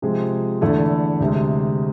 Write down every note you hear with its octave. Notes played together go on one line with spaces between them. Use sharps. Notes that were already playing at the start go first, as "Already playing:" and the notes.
C3 F3 G#3 C4 G#4
E2 D3 A3 E4 A4
D2 C3 G#3